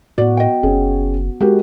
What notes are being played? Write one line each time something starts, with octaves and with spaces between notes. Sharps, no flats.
A2 B3 F#4 D5
D#5 G5
F#1 C#4 G#4
G#3 F#4 G4 A#4